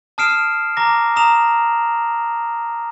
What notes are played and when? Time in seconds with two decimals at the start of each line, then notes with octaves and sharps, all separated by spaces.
0.18 A5 D#6 F6 C7 D7 E7
0.77 A#5 D6 A#6
1.16 A#5 D#6 E7 F7